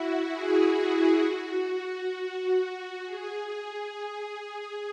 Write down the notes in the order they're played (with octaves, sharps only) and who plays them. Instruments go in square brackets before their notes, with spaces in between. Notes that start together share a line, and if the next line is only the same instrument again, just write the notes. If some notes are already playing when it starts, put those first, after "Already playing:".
Already playing: [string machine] E4 F#4
G#4
F#4
E4
F#4
F#4
G#4